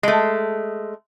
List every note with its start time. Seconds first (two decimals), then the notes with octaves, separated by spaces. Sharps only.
0.03 G#3 A3